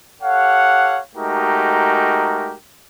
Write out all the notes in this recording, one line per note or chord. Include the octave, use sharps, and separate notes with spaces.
G4 A4 C#5 F5 F#5
G#3 A3 D#4 F#4 G4 A#4